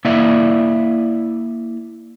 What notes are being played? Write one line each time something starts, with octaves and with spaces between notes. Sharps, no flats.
A#3 E4 D5 E5